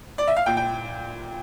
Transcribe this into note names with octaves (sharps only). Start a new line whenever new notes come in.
D5
E5
F5
A#2 G5
G5